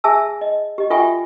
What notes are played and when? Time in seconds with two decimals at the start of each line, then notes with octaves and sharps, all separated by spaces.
0.04 G#4 E5 G#5 A5 E6
0.41 D#5
0.78 G4 D#5
0.90 F4 A4 E5 G5 G#5 C#6